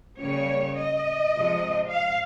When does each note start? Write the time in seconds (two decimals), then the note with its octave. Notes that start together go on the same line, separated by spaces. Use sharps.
0.21 C#3 G3 A#3 C#5
0.77 D#5
1.34 C3 F3 G#3
1.89 F5